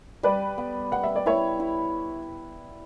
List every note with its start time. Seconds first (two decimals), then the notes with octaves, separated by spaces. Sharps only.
0.23 G3 B4 D5
0.58 B3
0.92 B3 F#5
1.04 E5
1.16 D5
1.26 E4 C#5 E5
1.60 E4